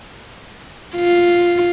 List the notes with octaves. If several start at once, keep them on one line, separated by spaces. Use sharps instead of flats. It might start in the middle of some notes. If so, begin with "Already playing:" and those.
F4